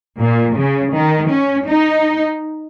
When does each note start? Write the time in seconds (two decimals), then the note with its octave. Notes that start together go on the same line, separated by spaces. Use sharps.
0.20 A#2
0.57 C#3
0.94 D#3
1.30 C#4
1.67 D#4